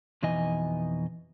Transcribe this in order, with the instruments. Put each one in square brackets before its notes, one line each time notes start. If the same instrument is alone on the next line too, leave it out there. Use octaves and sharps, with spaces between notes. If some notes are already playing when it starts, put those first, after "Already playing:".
[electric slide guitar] F2 B2 E3 D#4 D#5 G#5